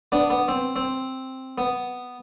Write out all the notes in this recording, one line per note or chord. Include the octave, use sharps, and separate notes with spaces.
B3 D4
B3
C4
C4
B3